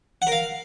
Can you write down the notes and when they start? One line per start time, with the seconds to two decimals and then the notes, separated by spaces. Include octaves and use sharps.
0.22 F#5
0.27 A#4
0.32 F5